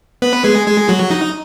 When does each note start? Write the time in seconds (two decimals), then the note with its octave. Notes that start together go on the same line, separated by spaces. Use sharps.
0.22 B3 B4
0.44 G#3 G#4
0.67 G#3 G#4
0.89 F#3 F#4
1.11 D#4